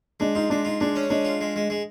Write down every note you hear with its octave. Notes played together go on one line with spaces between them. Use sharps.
G#3 D4
D#4 F4
G#3 D4
D#4 F4
G#3 D4
C#4
G#3 D4
F4
G#3
G#3
G#3